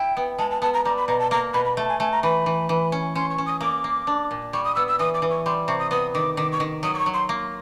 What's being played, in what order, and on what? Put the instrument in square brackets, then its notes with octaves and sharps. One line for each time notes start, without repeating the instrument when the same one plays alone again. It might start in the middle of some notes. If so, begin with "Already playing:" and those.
Already playing: [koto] E4 [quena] G5
[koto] B3
[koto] G#3 [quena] A5
[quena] A5
[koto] B3 [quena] A5
[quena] A#5
[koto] G3 [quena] A#5
[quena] B5
[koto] B2 [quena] A#5
[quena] A5
[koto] A#3 [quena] A#5
[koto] B2 [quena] B5
[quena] B5
[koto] A3 [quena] A5
[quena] G#5
[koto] A3 [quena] G#5
[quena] A#5
[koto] E3 [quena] B5
[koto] E3
E3
C#4
[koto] C#4 [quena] C6
[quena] C#6
[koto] C#4
[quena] D#6
[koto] A#3 [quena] D6
[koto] A#3
D4
A#2
[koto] G3 [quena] C#6
[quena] D#6
[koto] B3 [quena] E6
[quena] E6
[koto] E3 [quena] D#6
[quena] D6
[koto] E3
[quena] C#6
[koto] G3 [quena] C6
[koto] C3 [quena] C#6
[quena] D#6
[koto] B3 [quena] D#6
[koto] D#3 [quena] D6
[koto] D#3 [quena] D6
[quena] C#6
[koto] D#3
[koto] F#3 [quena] D#6
[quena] D6
C#6
[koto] F#3
[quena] C6
[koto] A#3